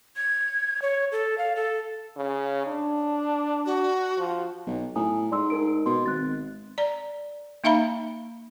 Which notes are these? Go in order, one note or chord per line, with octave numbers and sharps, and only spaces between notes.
G#6
C#5
A4
F5
A4
C#3
D4
F#4
F3
B1
A2 G#5 A#5 D#6
G#2 D5 C6 E6
D#4 A#4 D7
B2 C6
G#1 F#6 A6
D5 A#5
A#3 D#4 E5 F5 A#5 B5